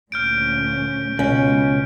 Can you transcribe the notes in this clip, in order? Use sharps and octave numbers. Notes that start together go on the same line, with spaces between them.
D2 A#2 C#4 F6 G6 D7
C#2 B2 G#3 C#4